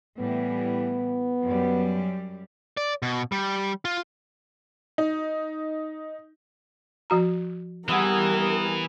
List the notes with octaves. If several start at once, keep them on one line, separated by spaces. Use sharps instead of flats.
A2 E3 G3 B3
F#2 G3
D5
B2
G3
F4
D#4
F3 F#4 A#5
E3 G3 B3 E4 G#4 A#4